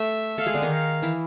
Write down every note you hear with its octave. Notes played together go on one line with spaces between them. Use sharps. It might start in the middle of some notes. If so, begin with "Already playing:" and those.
Already playing: A3 A4 E5
A3 A4 F5
G#3 G#4
D3 D4
D#3 D#4
F5
E3 E4